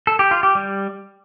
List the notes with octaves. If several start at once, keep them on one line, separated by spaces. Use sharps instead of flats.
A4
G4
F4
G4
G3